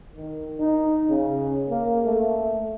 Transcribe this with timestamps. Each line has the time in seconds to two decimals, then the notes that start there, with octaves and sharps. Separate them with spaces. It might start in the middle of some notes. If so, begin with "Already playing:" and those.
0.16 D#3
0.60 D#4
1.10 C#3
1.70 A#3
2.06 A3